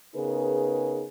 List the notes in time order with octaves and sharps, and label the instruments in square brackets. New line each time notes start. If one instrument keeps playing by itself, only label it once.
[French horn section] C#3 B3 D#4 G#4 A#4 B4